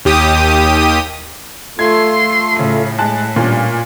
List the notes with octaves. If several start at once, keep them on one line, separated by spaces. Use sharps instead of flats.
D#2 G4 D#6
A3 F4 A4 C6 G#6
A2 C#3
G#3 A5 F#6
G2 A#2 C#4